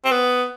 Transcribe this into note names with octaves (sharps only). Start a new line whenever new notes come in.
C4
B3